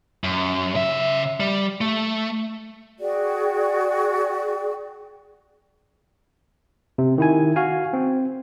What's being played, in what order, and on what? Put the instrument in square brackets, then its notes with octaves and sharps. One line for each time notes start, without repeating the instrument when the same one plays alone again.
[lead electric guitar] F#2
C#3 E5
G3
A3
[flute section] F#4 G#4 D5 G5
[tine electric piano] C3
D#3 E4 G#5
F#4 F5 G#5
C4